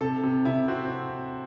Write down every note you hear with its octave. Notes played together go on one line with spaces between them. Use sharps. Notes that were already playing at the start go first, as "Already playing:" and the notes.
C3 A4
C3
C3 E4
C4 F#4